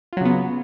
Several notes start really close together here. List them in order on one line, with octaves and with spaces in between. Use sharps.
F4 F#3 C#3 B3